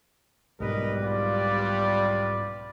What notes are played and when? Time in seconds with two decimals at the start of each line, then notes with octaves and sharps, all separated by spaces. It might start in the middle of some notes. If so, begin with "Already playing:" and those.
0.60 B1 G#2 B2 G3 A#4 B4 D#5
1.03 F4 B4 D5